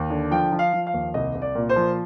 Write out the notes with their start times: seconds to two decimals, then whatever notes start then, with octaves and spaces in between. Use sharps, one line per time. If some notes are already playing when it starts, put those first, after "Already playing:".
Already playing: D#2
0.10 D3
0.31 F3 G5
0.52 F3
0.59 F5
0.73 F3
0.87 F5
0.93 D#2
1.14 C2 D#5
1.35 C2
1.42 D5
1.55 A#2
1.69 C5
1.76 F3